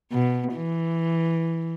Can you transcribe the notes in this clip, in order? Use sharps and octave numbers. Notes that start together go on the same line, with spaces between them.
B2
E3